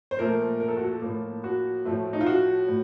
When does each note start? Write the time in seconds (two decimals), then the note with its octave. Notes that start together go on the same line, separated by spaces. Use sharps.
0.11 C5
0.19 A#2 F3 A3 A#4
0.60 A#4
0.68 A4
0.77 F#4
0.84 A4
1.02 A2 F3 A#3
1.44 F#4
1.85 A2 F3 A3
2.13 D#4
2.21 F4
2.27 F#4
2.68 A2